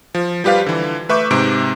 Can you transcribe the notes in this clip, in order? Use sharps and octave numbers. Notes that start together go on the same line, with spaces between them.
F3
F3 G3 G4 B4 F5
D3 E3
A3 B4 E5 C#6 D6 G6
G#2 C3 D7